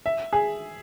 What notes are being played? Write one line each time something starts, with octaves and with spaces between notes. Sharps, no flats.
E5
G#4